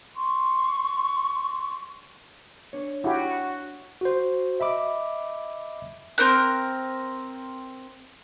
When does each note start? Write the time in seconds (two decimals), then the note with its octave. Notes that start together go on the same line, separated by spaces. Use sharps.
0.15 C6 C#6
2.73 D4 C#5
3.04 E4 F#4 G4
4.01 F#4 C5
4.60 D#5 E5 B5 D6
6.18 C4 A#4 F#6